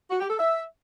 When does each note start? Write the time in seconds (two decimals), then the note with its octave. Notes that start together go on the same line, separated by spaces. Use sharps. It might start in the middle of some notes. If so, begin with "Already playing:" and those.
0.10 F#4
0.20 G4
0.29 A4
0.39 E5